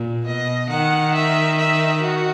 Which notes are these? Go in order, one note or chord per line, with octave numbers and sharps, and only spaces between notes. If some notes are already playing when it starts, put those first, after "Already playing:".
Already playing: A#2
B2 D#5
D#3 F#5
E5
E5
F#4